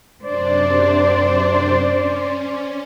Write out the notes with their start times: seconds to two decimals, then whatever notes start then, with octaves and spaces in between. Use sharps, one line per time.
0.22 F#2 C3 D4 C5 D5
1.77 C#4